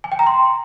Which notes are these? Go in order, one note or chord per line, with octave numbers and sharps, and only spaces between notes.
G#5
G5
A#5
C6